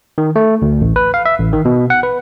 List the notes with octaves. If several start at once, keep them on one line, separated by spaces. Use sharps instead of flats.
D#3
A3
D2
A1
B4
F5
E5
A1
D#3
B2
F#5
B4